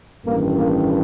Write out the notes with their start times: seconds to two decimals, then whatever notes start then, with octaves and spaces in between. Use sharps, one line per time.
0.25 A1 G2 D#3 A#3
0.56 A#3